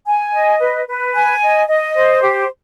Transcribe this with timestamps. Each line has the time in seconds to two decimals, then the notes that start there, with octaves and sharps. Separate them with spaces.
0.06 G#5
0.33 D#5
0.60 B4
0.87 B4
1.15 G#5
1.42 D#5
1.68 D#5
1.95 C5
2.22 G4